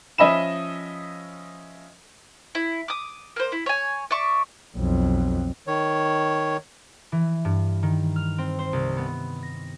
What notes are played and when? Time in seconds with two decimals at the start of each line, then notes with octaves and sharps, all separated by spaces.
0.18 F3 C#4 D#5 E5 B5 E7
2.55 E4
2.88 D6 D#6
3.36 A#3 C5
3.52 E4
3.66 C#5 G#5
4.11 D5 E5 C#6
4.76 B1 F2
5.67 D#3 C#5
7.12 E3
7.45 G2
7.83 D#3
8.16 F6
8.38 C4
8.59 C5
8.73 C2
8.97 B3
9.43 A#6